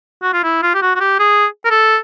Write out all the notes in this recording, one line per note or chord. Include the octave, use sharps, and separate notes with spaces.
F#4
F4
E4
F4
G4
F#4
F#4
G4
G#4
A#4
A4